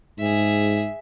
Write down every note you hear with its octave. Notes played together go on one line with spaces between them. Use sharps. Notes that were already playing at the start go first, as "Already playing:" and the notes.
G#2 G#4 E5